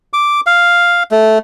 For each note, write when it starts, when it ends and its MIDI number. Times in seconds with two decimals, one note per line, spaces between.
0.13 0.41 86
0.46 1.03 77
1.11 1.38 57